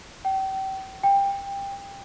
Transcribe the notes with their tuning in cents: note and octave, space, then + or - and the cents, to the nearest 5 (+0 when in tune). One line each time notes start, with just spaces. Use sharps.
G5 -35
G5 +20